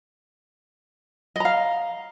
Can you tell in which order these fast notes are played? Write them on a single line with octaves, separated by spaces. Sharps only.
D#5 A#5 F5